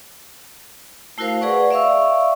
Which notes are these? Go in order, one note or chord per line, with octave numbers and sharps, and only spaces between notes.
A3 E4 F#4 A#4 C5 F5
G#4 B4 D5 F#5 C#6
D5 E5 F5 C#6 E6